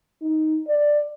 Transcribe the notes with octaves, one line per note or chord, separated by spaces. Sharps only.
D#4
D5